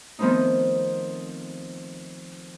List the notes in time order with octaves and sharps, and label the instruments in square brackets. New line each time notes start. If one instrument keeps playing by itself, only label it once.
[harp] D#3 F3 A3 B3 C4 D#4